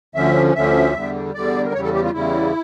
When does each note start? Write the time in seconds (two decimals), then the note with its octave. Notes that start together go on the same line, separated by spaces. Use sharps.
0.15 D2 D3 F3 C#4 E5
0.55 D2 D3 F3 C#4 E5
0.95 E2 D3 G3
1.34 E2 D3 G3 D5
1.65 A#4
1.74 E2 C#3 G3 C#5
1.83 A4
1.94 G4
2.04 F4
2.13 E2 C#3 G3 E4